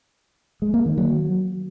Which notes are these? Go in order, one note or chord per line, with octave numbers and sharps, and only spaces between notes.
G#3
A#3
D#3
F#3